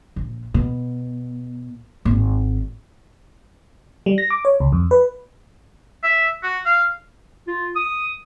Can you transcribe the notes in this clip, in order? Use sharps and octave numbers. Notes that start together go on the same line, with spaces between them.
A#1
B2
G#1
G3
A#6
D6
C#5
C#2
F2
B4
E5
F#4
F5
F4
D#6